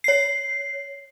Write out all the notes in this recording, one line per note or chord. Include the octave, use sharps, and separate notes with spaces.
C#5 C7